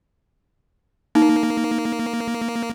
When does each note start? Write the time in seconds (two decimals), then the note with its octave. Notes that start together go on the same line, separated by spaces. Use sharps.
1.15 A#3 D#4